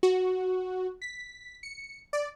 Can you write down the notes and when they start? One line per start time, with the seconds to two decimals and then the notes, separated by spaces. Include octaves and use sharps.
0.03 F#4
1.02 B6
1.63 C#7
2.13 D5